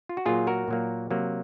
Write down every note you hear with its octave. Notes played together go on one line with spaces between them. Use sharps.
F4
F#4
A#2 F#3 A#3 F4 G#4
F#4 A#4
A#2 F#3 A#3
C3 F#3 A#3